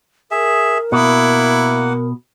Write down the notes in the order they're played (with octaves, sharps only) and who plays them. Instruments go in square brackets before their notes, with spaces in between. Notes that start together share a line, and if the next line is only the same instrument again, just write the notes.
[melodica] G#4 E5 [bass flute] A#4
[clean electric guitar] B2 [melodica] A#3 F#5 [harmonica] E4